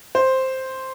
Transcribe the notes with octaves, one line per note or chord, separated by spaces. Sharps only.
C5